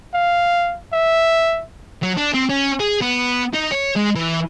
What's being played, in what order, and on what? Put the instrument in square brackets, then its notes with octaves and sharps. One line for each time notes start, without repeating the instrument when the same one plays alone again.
[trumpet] F5
E5
[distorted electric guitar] F#3
D4
C4
C#4
G#4
B3
D#4
C#5
G#3
E3